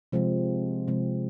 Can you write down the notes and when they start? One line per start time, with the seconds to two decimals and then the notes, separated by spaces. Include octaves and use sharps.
0.12 C3 F3 G#3 C4
0.88 C3 F3 G#3 C4